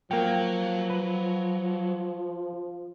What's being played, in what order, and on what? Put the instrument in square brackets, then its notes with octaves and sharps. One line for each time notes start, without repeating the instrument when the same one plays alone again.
[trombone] F3 [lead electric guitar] F#3 [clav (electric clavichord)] A#3 F5 G5
[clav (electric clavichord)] B4